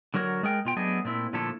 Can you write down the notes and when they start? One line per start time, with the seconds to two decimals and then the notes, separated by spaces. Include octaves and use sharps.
0.14 D3 F#3 F#4 A#4 C#5
0.43 G#3 G#4 A#4 G5
0.65 B2 F4 G5
0.76 F#3 A3 B3 D4 G#4 D#5
1.05 A#2 A3 C4 E4
1.33 A#2 D3 F3 A3 E4 A4